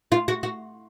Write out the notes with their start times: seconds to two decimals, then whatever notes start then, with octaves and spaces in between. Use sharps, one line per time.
0.12 F4
0.28 F#4
0.43 F#4